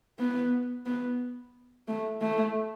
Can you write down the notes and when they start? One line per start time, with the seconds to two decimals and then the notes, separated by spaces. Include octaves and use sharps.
0.19 B3
0.86 B3
1.88 A3
2.21 A3